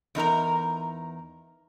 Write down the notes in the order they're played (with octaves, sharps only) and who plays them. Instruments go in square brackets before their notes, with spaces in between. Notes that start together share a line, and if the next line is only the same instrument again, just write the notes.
[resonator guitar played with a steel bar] E2 D#4 A#4 A#5